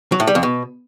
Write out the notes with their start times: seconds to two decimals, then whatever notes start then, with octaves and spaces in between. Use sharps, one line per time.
0.12 F#3
0.20 A2
0.27 G3
0.35 F2
0.43 B2